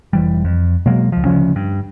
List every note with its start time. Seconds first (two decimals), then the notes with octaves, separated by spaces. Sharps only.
0.13 F1 E3 G3
0.44 F2
0.86 B2 F#3 G#3 A#3
1.12 C#2 F3
1.25 D2 C#3 F3 C#4
1.56 G2